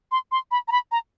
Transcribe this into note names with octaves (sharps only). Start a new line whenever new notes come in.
C6
C6
B5
A#5
B5
A#5